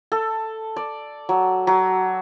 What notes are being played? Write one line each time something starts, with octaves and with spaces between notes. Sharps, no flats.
A4
D5
F#3
F#3